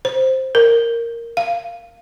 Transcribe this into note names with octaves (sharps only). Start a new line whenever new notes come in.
C5
A#4
F5